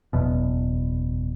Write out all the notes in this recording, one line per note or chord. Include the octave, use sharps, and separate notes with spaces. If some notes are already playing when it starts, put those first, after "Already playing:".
F#1 E2 B2